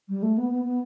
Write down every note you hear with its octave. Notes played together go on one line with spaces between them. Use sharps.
G3
A3
B3
B3
B3